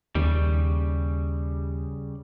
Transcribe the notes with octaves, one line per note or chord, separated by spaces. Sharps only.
D#2 C#3 G3